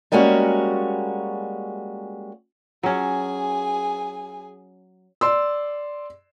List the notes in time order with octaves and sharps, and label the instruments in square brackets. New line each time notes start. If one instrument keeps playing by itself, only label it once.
[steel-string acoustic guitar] G3 G#3 A#3 C#4 F#4
[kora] F#3 C#4 [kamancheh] G#4 G#5
[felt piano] D5 C6 E6